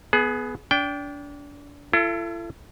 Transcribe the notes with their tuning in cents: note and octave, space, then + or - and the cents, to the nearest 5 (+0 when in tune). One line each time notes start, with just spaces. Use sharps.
B3 +0 G#4 +25
D4 -30 G5 +0
E4 +45 A4 +15